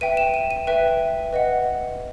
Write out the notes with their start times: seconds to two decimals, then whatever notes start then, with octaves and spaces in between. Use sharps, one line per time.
0.01 B4 E5 G5 D#7
0.17 E7
0.34 D#7
0.51 D#7
0.67 B4 E5 G5
1.33 B4 D#5 F#5